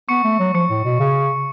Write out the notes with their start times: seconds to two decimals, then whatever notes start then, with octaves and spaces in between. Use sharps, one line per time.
0.09 B3 C#6 C#7
0.24 A3
0.39 F#3
0.54 F3 C#6 C#7
0.70 A2
0.85 B2
1.00 C#3